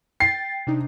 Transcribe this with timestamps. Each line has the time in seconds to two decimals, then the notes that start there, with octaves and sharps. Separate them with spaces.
0.20 G5 A6 C7
0.67 C3 D4 D#4